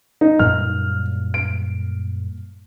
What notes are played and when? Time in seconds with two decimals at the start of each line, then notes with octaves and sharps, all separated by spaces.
0.21 D#4
0.39 F#2 A#2 G3 F6
1.34 D7